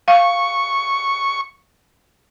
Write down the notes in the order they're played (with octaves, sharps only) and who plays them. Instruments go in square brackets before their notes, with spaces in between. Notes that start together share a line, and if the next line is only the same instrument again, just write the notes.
[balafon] F5 [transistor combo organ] C#6